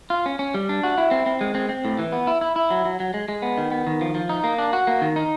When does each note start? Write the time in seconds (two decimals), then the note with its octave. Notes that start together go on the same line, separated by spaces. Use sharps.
0.10 F4
0.26 C#4
0.39 C#4
0.54 G3
0.69 D4
0.83 F#4
0.98 E4
1.11 C4
1.26 C4
1.41 G#3
1.55 C4
1.69 C4
1.85 A2
1.99 E3
2.12 B3
2.27 E4
2.41 E4
2.56 E4
2.71 F#3
2.85 F#3
3.00 F#3
3.14 G#3
3.29 G#3
3.42 B3
3.58 D#3
3.72 B3
3.87 D#3
4.01 F3
4.15 F3
4.29 D#4
4.44 A#3
4.58 D4
4.73 F#4
4.87 A#3
5.02 D#3
5.16 D#4